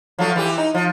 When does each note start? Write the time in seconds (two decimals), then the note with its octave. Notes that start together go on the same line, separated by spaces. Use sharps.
0.19 F3 F#3 A3
0.36 E3 E4 G4
0.58 D#4
0.74 F3